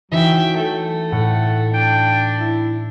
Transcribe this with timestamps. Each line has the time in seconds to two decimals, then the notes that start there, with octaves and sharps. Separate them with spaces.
0.11 E3 F#3 D#4 E5 G5 D7
0.57 A3
1.12 A2 F#5
1.74 D4 G5
2.40 E4